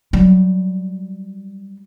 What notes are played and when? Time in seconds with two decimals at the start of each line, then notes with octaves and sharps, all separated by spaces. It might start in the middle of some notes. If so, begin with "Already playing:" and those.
0.13 F#3 G3